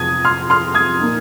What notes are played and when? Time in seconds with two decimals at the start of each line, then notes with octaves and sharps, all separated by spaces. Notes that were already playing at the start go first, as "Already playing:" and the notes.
Already playing: F2 C3 D#6 G#6
0.25 C6 F6
0.50 C6 F6
0.74 D#6 G#6
1.00 A#2 A#3 D#4